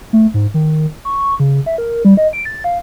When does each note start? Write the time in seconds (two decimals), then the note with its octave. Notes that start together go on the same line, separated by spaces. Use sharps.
0.13 A3
0.34 G#2
0.54 D#3
1.05 C#6
1.40 C#3
1.66 E5
1.78 A#4
2.05 G3
2.17 D#5
2.33 D7
2.45 A6
2.64 F5